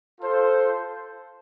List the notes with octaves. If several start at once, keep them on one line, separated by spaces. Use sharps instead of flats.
F4 A4 C5